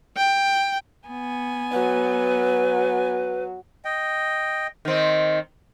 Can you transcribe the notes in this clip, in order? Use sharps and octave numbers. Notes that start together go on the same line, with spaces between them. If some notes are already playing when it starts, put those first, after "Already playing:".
G5
B3 G#5
F#3 B4
D#5 G5
D#3 C4